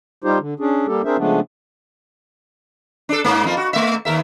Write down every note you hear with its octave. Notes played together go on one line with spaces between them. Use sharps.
G3 D#4 F4 G4 C5
D3
C#4 D4 G#4
G3 A#3 G4 A4
C4 D4 G#4 A#4 C5 E5
C#3 F3 G#3 A3 B3 D4
D4 A4
G#2 A#3
F2 A#3 F4
F#4
A3 E5
D#2 A#4 E5